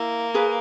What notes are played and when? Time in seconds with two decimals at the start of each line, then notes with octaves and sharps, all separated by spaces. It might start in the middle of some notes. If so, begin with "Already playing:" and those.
Already playing: A#3 E4
0.34 G#4 B4